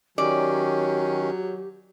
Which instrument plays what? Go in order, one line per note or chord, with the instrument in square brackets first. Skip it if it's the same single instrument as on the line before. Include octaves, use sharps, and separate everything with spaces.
[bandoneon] D#3 C#4 [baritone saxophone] F#3 [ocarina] G4 [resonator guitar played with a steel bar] D5